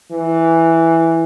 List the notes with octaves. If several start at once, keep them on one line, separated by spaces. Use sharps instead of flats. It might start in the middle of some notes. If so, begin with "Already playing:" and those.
E3